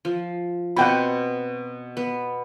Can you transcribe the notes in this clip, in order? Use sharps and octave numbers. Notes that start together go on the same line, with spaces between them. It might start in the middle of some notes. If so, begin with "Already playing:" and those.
F3
B2 C4 F#5 G5 B5
B3